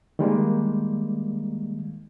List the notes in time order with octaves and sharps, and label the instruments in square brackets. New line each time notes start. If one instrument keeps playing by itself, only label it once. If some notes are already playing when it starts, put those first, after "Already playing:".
[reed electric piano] D#3 G3 G#3 A#3